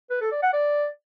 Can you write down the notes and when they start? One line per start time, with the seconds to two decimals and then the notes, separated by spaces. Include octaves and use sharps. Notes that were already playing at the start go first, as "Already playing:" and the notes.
0.11 B4
0.21 A4
0.32 D5
0.43 F#5
0.53 D5